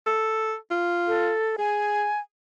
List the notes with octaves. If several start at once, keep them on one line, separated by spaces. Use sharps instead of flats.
A4
F4
A4
G#4 G#5